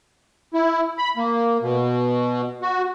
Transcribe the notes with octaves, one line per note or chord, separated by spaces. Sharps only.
E4
B5
A#3
B2
F#4